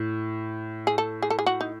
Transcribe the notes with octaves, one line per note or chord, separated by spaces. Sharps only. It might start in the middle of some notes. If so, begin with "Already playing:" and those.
Already playing: A2
G#4
A4
G#4
A4
G#4
F#4
D#4